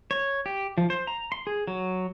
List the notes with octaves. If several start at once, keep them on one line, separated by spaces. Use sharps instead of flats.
C#5
G4
F3
C5
A#5
C6
G#4
F#3